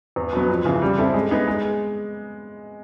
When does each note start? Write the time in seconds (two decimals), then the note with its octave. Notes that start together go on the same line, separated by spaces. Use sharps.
0.16 E2
0.33 B2 F#3 B3
0.49 F2
0.65 C#3 E3
0.82 G3
0.98 C4 E4 A4
1.14 G#3
1.31 B3 D#4 G#4
1.47 G#3